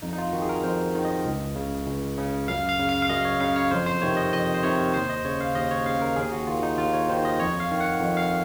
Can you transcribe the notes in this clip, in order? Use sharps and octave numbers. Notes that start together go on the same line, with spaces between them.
F2 D#4
D#4
F4
D#3 F#4
G#4
A#4
F2 C5
D#3
D#5
C#2
C#3
C#2
C#3
F#2 F5
F5
C#3
F5
F5
F#2 D#5
C#5
C#3 F5
C#5
F2 C5
C5
C3 D#3 C#5
D#5
F2 D#5
C5
C3 D#3 C#5
D#2 C5
D#5
C#3 C#5
F5
D#2 D#5
C#5
C#3 F5
A#4
D#2 G#4
F#4
D#3 F4
D#4
D#2 F4
C#5
D#3 C5
D#5
F2 C#5
F5
D#3
F#5
F2
F5